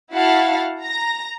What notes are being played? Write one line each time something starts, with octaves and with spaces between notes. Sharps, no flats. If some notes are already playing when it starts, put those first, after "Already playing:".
E4 F#4 F5 F#5 A5
A#5 A#6